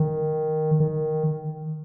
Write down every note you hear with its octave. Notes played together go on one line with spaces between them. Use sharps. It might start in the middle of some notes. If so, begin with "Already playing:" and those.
Already playing: D#3
D#3